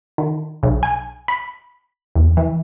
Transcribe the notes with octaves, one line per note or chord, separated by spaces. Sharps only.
D#3
B1
G#5
B5
E2
E3